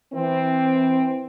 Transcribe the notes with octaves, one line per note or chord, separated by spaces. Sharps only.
E3 C4